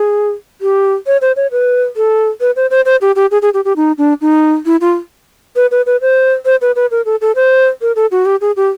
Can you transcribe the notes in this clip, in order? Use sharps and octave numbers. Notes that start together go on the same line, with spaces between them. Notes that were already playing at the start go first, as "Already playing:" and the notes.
Already playing: G#4
G4
C#5
C5
C#5
B4
A4
B4
C5
C5
C5
G4
G4
G#4
G#4
G4
G4
D#4
D4
D#4
E4
F4
B4
B4
B4
C5
C5
B4
B4
A#4
A4
A4
C5
A#4
A4
F#4
G4
G#4
G4